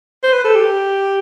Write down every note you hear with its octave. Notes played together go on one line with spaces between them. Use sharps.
C5
B4
A4
G4